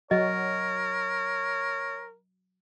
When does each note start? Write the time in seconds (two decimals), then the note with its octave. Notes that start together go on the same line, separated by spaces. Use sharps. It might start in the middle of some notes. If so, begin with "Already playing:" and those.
0.11 F#3 F#4 A#4 C#5 D#5